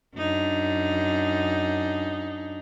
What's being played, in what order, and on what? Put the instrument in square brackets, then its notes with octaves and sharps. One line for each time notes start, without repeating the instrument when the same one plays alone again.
[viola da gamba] F#2 D4 D#4